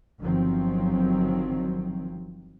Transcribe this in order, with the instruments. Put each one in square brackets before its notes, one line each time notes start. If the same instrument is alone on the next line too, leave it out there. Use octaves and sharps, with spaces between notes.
[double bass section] G1 D#3 F3 F#3 C4